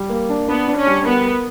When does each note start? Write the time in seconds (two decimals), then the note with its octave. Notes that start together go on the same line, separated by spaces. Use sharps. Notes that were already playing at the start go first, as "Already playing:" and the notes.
Already playing: G3
0.09 A#3
0.29 D4
0.48 B3 D4
0.68 D4
0.77 C#4
0.87 G3
1.05 B3 A#4
1.25 A#4